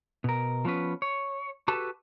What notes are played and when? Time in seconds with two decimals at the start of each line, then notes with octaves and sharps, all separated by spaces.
0.24 B2 A#4
0.65 F3 B3 C#4 B4
1.02 C#5
1.68 F#4 G4 A4 B4 A5